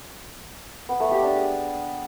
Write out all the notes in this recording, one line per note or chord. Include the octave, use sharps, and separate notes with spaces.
B3
A3
G4
D4
G#4